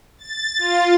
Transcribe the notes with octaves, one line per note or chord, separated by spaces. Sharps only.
A6
F4